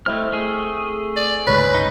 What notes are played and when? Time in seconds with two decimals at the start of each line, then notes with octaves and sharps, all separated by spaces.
0.06 A3 C4 E4 D#5 F6
0.32 A3 G#4
1.16 D5
1.47 G1 C#2 G#2 C#4 B4
1.74 D#4